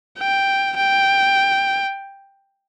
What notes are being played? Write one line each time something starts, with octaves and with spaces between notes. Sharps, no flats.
G5
G5